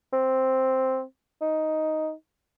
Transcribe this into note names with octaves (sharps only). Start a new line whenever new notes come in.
C4
D#4